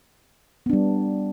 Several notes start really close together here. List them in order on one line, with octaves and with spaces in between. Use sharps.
B3 D4 G3